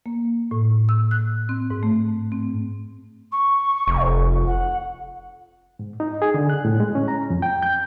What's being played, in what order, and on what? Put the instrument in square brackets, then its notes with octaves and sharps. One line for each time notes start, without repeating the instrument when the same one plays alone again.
[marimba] A#3
A2
E6
F#6
C4
G#2
A3
C4
[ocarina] C#6
[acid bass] F1
[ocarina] F#5
[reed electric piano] G#2
D#4
G#4
D3
F#6
A2
G#3
C#4
A#5
F2
G5
G6